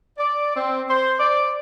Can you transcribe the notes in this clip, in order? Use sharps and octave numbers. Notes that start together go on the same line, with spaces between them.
D5
C4
C5
D5